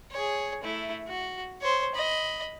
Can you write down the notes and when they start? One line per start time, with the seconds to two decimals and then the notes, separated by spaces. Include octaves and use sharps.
0.11 G#4 C#5
0.63 A3 E4
1.07 F#4
1.61 C5 C#5
1.95 D#5 B5